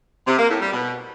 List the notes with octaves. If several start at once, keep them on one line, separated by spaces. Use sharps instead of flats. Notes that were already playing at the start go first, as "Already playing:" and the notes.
C3
A#3
A2
G3
B2